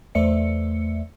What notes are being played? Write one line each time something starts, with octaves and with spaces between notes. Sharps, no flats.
E2 A3 C5 D5 E5 C#7